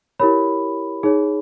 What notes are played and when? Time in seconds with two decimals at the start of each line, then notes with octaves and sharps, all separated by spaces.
0.20 E4 G4 A#4 C#5 B5
1.03 D#4 G#4 C#5